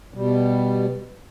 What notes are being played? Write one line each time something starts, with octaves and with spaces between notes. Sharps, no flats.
B2 G3